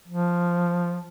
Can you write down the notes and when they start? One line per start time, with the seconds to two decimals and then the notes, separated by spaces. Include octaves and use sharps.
0.08 F3